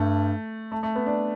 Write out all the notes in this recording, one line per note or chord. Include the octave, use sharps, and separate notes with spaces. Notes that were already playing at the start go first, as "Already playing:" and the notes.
Already playing: G2 A3
A3
A3
B3
D4